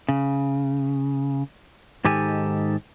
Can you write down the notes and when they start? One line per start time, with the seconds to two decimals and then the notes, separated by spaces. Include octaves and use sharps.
0.09 C#3
2.05 G#2 D#3 G4 A4 G#5